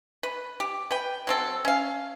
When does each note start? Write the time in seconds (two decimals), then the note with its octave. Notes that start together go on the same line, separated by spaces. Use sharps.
0.23 B4
0.60 G4
0.91 B4 G5
1.27 F#3 C4 A4
1.65 C#4 F5